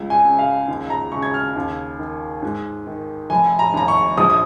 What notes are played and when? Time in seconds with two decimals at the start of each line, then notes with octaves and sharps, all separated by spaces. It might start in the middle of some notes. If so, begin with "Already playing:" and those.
Already playing: C#2
0.10 G#5
0.24 C#3
0.39 F5
0.68 D#2
0.90 A#5
1.12 C#3 C#6
1.22 G#6
1.34 F6
1.56 D#2
1.99 D#3
2.42 G#2
2.87 D#3
3.30 F1 G#5
3.59 A#5
3.74 D#2 A#5
3.88 C#6
4.18 A#1 D#6
4.30 D#6